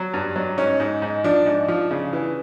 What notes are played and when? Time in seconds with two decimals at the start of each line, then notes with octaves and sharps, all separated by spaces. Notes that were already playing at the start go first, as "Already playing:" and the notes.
Already playing: F#3
0.14 G2
0.36 F#3
0.58 G#2 C#4
0.80 G#2
1.02 G#2
1.24 F3 D4
1.46 G#2
1.68 F3
1.91 C#3
2.13 E3